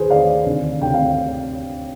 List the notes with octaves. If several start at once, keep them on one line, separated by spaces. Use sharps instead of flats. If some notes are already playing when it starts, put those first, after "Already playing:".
Already playing: D#2 D#3 G#4 B4 C5
D#2 D#3 D5 F5
D2 C3 D#3
D2 C3 D#3 G5
F5